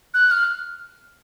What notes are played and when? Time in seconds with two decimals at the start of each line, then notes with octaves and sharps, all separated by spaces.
0.14 F#6
0.31 F6